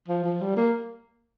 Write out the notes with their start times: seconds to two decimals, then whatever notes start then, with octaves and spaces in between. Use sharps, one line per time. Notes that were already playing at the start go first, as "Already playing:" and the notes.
0.08 F3
0.24 F3
0.41 G3
0.57 A#3